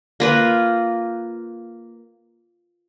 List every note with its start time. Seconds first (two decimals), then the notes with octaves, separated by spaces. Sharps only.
0.20 A#3 F4 B4